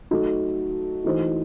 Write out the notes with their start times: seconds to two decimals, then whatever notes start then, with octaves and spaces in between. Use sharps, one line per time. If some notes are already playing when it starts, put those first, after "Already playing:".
0.11 F#3 A3 D#4 F#4
1.04 E3 A3 D#4 F#4 C5